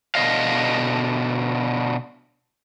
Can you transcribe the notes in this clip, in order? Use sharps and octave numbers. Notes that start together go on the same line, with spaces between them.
B2 D3 D#5 F5